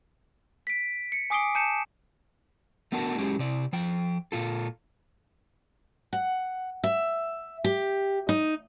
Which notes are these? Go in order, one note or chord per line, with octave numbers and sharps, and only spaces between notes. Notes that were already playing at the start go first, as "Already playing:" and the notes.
B6 D7
C#7
G#5 D6 D#6 C7 D7 G7
A5 G6 C#7 E7
A3 B3 D4 F#4 A#4 A5
F#3 G#3 C#4 G4
C3 D5
F3 G5
A#2 F4 A4
F#5
E5
G4
D#4